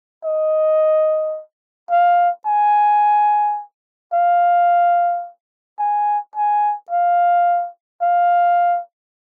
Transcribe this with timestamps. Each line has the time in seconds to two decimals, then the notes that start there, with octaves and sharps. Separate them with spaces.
0.24 D#5
1.91 F5
2.46 G#5
4.13 F5
5.79 G#5
6.35 G#5
6.91 F5
8.02 F5